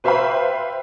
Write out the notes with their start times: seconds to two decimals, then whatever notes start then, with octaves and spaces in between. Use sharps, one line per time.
0.04 B4 C5 E5 F5 G5 B5